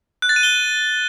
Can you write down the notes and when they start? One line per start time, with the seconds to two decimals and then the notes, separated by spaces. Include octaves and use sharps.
0.22 F#6
0.29 A6
0.36 D#7
0.43 G7